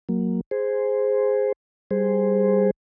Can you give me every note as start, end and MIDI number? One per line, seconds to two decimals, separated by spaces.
0.09 0.41 54
0.09 0.41 58
0.51 1.52 68
0.51 1.52 72
1.91 2.71 55
1.91 2.71 68
1.91 2.71 72